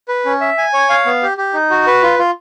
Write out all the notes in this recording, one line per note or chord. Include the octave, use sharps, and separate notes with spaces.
B4
C#4
E5
G#5
C#5
F5
B3
G4
G4
D#4
F#4
B4
F4
F4